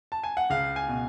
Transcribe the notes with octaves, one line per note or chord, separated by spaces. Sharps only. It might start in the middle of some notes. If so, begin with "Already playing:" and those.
A5
G#5
F#5
C#2 F5
G#5
B2